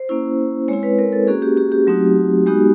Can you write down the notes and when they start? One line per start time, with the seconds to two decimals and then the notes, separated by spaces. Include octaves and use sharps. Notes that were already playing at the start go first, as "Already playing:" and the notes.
Already playing: C5
0.09 A#3 C#4 E4
0.68 G#3 C4 E4 C#5
0.83 B4
0.99 A#4
1.13 A4
1.27 A#3 C#4 F#4 G#4
1.42 G4
1.57 G4
1.72 G4
1.87 F#3 A3 C4 D#4 F#4
2.46 G#3 B3 D#4 F#4 G4